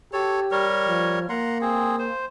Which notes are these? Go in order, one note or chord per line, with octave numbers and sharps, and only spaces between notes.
G4 A4 C#5
G3 A#4 C#5
F3
A#3 F#5 A#5 C6
C4 G#4
C5